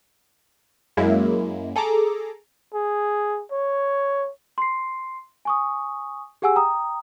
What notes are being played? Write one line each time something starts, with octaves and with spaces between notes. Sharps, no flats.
F#2 G#3 A#3 E4
G#4 A4 A#5 D6
G#4
C#5
C6 C7
G#5 C#6 D#6
G4 G#4 F#5 G#5 E6
G5 A#5 D#6